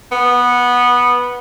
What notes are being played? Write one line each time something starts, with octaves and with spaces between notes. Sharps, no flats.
B3